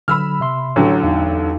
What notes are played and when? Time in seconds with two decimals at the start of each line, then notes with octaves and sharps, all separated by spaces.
0.08 D3 F#3 B5 E6 F6
0.40 C3 E5 C6
0.76 A1 D3 F#3 C#5 A#5
1.03 E2 D#4 F5